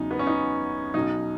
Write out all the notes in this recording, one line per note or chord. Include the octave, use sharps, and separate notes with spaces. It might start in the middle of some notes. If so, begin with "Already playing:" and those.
Already playing: E2 C#3 F#3 D#4
B3
C#4
D#4
B1 B2 F#3 D#4